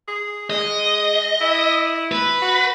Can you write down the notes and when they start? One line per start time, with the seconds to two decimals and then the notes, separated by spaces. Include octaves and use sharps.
0.08 G#4
0.50 G#3 D#5
1.41 E4
2.12 B4
2.41 F#4